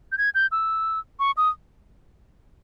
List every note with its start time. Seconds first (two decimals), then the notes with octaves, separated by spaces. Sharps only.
0.12 G6
0.18 G#6
0.35 G6
0.52 E6
1.19 C#6
1.37 D#6